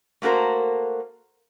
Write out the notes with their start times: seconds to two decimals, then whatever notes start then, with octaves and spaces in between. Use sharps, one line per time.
0.22 A3 A#3 F#4 A#4 C5